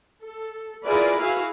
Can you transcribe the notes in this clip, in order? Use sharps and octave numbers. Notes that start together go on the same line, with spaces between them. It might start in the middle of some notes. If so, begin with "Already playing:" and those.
A4
E4 F4 G#4 A#4 B4 D5
E4 F#4 G#4 F5